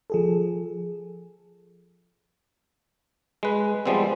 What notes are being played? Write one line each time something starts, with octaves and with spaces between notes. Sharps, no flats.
F3 G#4 A4
G#3 B4
F3 G3 G#3 B3 C4